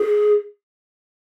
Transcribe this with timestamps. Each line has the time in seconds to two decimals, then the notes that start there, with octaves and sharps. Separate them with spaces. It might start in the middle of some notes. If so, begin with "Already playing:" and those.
Already playing: G#4